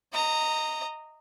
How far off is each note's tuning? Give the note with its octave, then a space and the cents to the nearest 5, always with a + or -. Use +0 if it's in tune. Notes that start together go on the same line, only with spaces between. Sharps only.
D#5 +0 A#5 -20